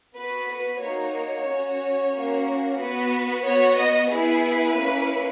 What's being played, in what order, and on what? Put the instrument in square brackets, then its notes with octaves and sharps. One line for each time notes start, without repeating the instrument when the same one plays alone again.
[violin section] B3 F#4 B4
B4
A#3 D#4 F#4 C#5
C#4 F#4
A#3 C#4 F#4
B3 F#4 B4
B3 F#4 C#5
D#5
B3 E4 G#4 B4
A#3 C#4 E4